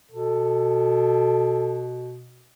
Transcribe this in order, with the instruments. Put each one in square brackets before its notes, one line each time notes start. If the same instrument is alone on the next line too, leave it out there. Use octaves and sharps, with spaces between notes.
[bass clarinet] B2 [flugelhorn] A4